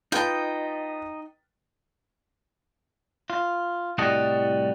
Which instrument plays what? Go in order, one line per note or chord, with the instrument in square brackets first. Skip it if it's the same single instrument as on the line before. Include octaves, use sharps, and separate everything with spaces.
[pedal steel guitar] D#4 D#5 [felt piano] F4 B4 A5 [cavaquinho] G5
[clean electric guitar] F4
C2 A2 G3 F#4 A4 D#5